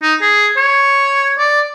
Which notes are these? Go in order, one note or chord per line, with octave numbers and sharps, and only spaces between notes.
D#4
G#4
C#5
D5